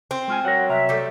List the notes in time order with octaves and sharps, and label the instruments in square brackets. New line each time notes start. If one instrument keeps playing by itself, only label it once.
[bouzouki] C4
[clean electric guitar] G#3 F4 G#5
[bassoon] F#3 [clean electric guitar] A#4 F#5
[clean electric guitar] C2 A#5 [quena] E5
[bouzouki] G3 A3